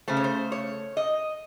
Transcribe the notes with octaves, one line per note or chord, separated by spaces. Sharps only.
C#3 A3 C5
C#5
C5
C#5
D#5